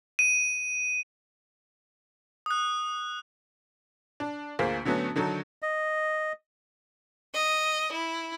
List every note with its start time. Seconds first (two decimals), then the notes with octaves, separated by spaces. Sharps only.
0.19 D#7
2.46 D#6 F#6
4.20 D4
4.59 D2 A#3 F4 G#4 C5 B6
4.85 D3 F#3 A3 B3 C#4 F#4
5.16 D3 D#3 F#3 D#4 A4
5.62 D#5
7.34 D#5
7.92 E4